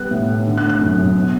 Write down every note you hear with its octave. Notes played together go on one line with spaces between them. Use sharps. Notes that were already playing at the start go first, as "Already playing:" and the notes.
Already playing: G3 B3 F#6
A2
A2
D3
F#6
A3
F#6
F#2
F#2
B2